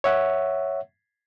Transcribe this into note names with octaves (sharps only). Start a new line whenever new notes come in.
C#5 E5 F#5